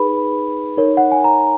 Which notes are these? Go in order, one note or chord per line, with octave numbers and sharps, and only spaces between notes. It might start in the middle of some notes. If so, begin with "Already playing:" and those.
Already playing: D#4 G#4 B4 B5
D#4 A#4 C#5
F#5
G#5
A#5